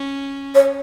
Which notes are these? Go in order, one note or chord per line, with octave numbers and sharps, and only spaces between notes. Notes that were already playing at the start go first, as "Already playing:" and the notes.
Already playing: C#4
C#5